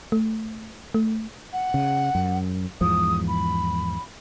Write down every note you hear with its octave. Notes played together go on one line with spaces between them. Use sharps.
A3
A3
F#5
C#3
F#2
E2 G#2 F3 D#6
B5